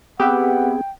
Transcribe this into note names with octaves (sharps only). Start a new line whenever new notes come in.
B3 C4 G4 G#4 B4 E5 F#5 G5